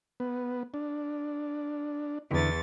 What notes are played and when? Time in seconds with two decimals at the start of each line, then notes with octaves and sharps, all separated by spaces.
0.20 B3
0.74 D4
2.31 E2 D3 E4 A6